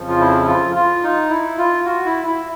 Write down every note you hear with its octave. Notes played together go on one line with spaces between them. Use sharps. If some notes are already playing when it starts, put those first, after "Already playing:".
Already playing: F2 C#3 F3
F4
E4
F4
F4
D#4
E4
F4
F#4
E4
E4